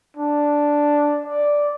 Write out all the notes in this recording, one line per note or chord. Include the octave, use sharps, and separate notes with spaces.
D4
D5